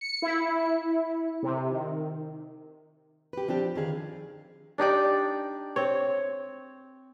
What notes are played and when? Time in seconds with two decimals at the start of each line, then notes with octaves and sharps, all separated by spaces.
0.01 C#7
0.22 E4
1.43 C3
1.71 D#3
3.33 G4 B4
3.48 F3 C4 D4 G4
3.75 D3 D#3 G#4 F5
4.78 D4 D#4 G4 D5
5.76 C4 C#5